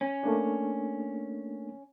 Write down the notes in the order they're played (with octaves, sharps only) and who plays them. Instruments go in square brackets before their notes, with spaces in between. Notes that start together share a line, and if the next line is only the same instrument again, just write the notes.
[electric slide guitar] C#4
[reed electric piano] A3 A#3 D4